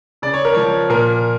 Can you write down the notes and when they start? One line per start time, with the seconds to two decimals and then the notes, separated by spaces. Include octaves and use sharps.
0.22 C#3 D5
0.34 C#5
0.45 A#4
0.54 F3 C#5
0.90 A#2 A#4